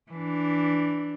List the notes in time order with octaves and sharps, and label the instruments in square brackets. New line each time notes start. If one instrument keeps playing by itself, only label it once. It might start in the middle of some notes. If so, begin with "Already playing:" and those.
[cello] E3 D4